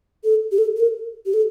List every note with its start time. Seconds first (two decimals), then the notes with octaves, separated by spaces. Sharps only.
0.24 A4
0.51 G4
0.58 A4
0.76 A4
0.80 A#4
1.26 G4
1.34 A4